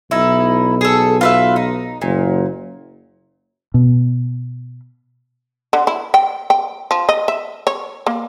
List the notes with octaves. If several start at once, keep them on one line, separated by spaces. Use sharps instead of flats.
B1 D#4 E4
G#4 A4
F4 B4 E5
D#4
F#1 A#2
B2
D3
E4
G5
G5
F3
D#5
E5
C#5
A#3